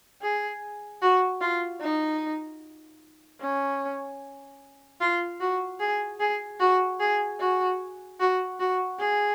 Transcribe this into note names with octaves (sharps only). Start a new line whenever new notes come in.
G#4
F#4
F4
D#4
C#4
F4
F#4
G#4
G#4
F#4
G#4
F#4
F#4
F#4
G#4